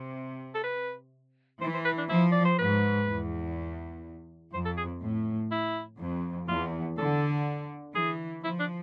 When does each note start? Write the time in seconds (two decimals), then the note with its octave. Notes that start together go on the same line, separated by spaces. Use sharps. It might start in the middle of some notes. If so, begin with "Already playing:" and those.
Already playing: C3
0.55 A4
0.63 B4
1.61 E3 C5
1.74 C5
1.85 B4
1.98 D4
2.09 F3 E4
2.32 D5
2.45 C5
2.59 G#2 B4
3.07 E2
4.54 F2 C5
4.66 A4
4.78 G#4
5.02 A2
5.52 E4
6.00 F2
6.48 E2 F4
6.98 D3 A4
7.95 E3 G#4
8.43 F3 E4
8.60 D4